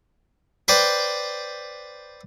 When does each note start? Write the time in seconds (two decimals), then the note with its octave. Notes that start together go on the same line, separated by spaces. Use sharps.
0.68 B4 C5 D5 G5